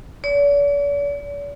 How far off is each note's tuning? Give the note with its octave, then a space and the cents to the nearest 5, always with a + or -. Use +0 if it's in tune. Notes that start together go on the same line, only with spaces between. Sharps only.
D5 -45